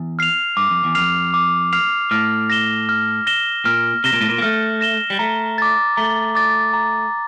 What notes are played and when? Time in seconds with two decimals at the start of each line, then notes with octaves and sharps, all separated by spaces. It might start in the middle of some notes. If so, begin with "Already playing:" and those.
Already playing: E2
0.19 F6 C7 F7
0.57 G2 D6
0.70 F2
0.84 E2
0.95 F2 F6 C7 F7
1.34 D6
1.73 F6 C7 F7
2.11 A2 F6
2.50 A#6 E7 G7
2.89 F6
3.27 A#6 E7 G7
3.65 A#2 F6
4.04 C3 A#6 E7 G7
4.13 A#2
4.21 A2
4.29 A#2
4.38 A#3
4.42 A3 F6
4.81 A#6 E7 G7
5.10 G3
5.19 A3 A#5
5.58 D6 A6
5.97 A3 A#5
6.35 D6 A6
6.74 A#5